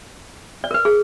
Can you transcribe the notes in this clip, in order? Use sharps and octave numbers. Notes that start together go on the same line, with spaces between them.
D5
A#4
B4
G#4